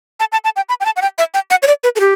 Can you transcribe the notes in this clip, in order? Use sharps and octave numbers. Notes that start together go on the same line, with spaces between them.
A5
A5
A5
G5
B5
G5
A5
F#5
G5
E5
G5
F#5
C#5
D5
B4
A4
G4